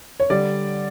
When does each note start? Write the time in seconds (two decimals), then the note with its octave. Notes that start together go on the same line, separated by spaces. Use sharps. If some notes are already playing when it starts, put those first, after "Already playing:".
0.20 C#5
0.30 D3 G3 D5